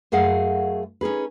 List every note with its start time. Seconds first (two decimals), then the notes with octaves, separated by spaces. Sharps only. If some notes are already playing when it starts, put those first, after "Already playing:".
0.12 F#2 A3 G#4 F5 F#5
1.01 C#4 D#4 G#4 B4